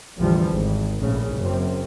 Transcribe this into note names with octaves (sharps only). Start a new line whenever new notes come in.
A1 E2 D3 E3 F3 G3
G#1
A#1 A2 C#3
F#1 F#2 C4